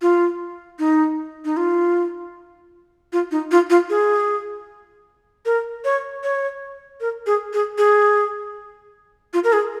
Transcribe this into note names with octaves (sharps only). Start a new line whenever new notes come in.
F4
D#4
D#4
F4
F4
D#4
F4
F4
G#4
A#4
C#5
C#5
A#4
G#4
G#4
G#4
F4
A#4
G#4